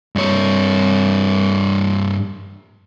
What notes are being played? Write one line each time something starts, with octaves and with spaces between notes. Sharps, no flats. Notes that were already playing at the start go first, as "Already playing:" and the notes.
G2 C#5